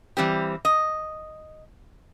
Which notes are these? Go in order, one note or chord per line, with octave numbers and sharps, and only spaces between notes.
E3 G3 C4 G4
D#5